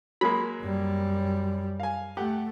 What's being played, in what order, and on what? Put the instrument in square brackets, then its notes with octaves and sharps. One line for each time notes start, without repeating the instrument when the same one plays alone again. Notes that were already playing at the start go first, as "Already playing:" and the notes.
[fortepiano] F#3 G#3 A#3 [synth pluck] B5
[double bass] F#2 G3
[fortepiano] F5 G#5
[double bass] A3 [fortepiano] G4 F#5